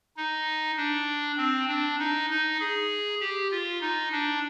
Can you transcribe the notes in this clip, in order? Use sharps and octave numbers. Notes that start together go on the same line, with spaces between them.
D#4
D4
C4
D4
D#4
D#4
G#4
G4
F4
D#4
D4